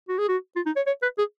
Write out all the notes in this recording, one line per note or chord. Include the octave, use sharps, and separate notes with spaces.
F#4
G#4
F#4
F4
D#4
C#5
C#5
B4
G#4